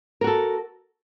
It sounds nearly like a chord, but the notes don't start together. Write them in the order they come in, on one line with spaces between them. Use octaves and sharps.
A#4 F#4 A4